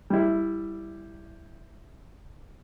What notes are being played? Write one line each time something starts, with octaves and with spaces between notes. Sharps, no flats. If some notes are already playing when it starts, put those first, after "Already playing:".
G3 E4